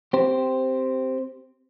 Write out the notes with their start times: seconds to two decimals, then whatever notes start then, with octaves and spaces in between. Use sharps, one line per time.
0.13 C4 G4 C5